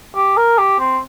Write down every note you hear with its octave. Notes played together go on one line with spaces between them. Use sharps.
G4
A#4
G4
C4